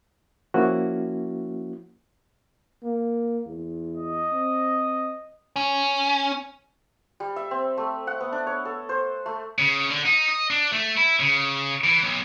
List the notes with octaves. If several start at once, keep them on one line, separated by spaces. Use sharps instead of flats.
F3 A#3 C#4 E4 F#4
A#3
E2
D#5
C4
C#4
G3
E5
C4
A3
F#5
B3
D4
C#5
A4
C5
A3
C#3
D3
D#4
D#5
D4
A3
E4
C#3
E3
B1